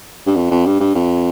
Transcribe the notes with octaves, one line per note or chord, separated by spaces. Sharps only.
G2
F2
F2
G2
G2
F2